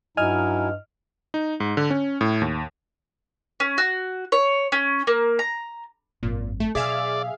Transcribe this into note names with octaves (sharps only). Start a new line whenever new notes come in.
G2 F#3 D#4 E4 D#5 G#5 F6
D#4
G#2
D3
C#4
A2
D#2
C#4
F#4
C#5
C#4
A#3
A#5
G#1 F#2 A#2
A3
B2 F#3 G#4 D5 E5 F5